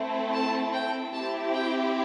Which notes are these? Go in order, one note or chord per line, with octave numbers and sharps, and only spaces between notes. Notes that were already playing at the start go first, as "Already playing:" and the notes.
Already playing: A3 C4 E4 A4
A5
G5
C4 E4 G4 A5
G5